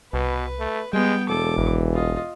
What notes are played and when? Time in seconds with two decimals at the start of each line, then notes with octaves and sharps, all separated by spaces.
0.14 C2 B2 B4
0.60 A3
0.93 G3 G#3 B3 G5
1.29 E1 A4 D6
1.58 G#1 E3
1.94 F4 D#5